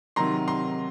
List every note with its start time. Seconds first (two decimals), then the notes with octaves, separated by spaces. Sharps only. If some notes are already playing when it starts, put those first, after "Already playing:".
0.16 C3 D#3 F#3 A#5 C6
0.48 A#5 C6